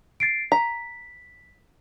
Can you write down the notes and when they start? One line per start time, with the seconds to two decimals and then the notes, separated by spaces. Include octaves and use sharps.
0.20 A6 C7 D7
0.52 A#5 B6